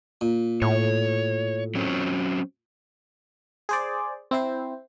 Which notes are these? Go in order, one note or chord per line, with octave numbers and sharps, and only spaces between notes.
A#2
A2 C#5
F#3 C4 C#4
G#4 C5 D5
C4 E4 C5